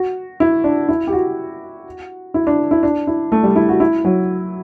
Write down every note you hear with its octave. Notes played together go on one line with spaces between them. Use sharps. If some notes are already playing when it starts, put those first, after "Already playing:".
Already playing: F#4
E4
D4
E4
G4
F#4
E4
D4
E4
D4
E4
A3
G3
E4
F#4
E4
F#3